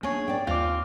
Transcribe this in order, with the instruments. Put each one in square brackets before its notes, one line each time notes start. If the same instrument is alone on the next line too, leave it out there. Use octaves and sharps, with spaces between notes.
[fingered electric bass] A#3 B3 D4 [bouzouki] G#4 C#5
[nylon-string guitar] D5 G5
[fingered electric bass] D#2 [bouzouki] C4 [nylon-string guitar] F4 [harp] F5 D6